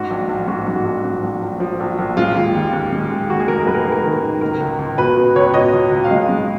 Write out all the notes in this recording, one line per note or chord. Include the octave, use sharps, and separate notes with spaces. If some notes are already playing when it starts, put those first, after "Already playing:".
Already playing: G#2 F#4
A#1
A#1
G#2 F#4
G#2
F#4
A#1
G#2
A#1
A#1
F3
A#1
A#1
G#3 F4
D#2
D#2
D#2
G#3
G#3
D#2 F#4
G#4
F1 A#4
G#3 B4
A#4
D#3 G#4
A#4
D#3
D#3
C#2 A#4
C#2
C#2
B2 B4
B2
C#2 C#5
B2 D#5
C#2
C#2
F5
G#3 D#5
G#3